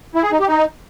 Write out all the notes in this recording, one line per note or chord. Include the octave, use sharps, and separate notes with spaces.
E4
G#4
D#4
G4
D#4